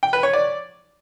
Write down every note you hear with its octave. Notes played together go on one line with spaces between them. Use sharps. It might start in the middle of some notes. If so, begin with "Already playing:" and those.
G5
B4
C#5
D5